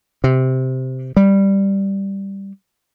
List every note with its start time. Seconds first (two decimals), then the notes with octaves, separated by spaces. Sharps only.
0.24 C3
1.17 G3